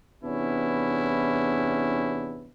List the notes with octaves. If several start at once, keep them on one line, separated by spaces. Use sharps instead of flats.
E2 C3 B3 C#4 D4 E4